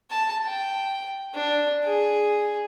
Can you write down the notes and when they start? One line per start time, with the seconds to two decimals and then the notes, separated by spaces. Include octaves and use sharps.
0.11 A5
0.45 G5
1.34 D4
1.84 G#4